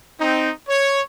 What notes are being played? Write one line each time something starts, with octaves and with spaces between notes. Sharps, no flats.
C4 D#4
C#5